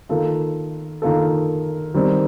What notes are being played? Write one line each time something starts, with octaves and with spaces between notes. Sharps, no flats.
D#3 A#3 F4 A4
D#3 A#3 F4 A4
D#3 G3 C4